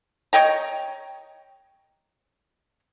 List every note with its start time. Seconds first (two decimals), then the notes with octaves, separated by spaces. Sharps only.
0.33 C#5 D#5 G5 A#5